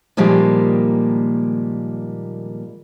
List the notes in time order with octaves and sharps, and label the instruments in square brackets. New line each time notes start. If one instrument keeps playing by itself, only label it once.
[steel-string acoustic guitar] A#2 D#3 F3 G3 G#3 A#3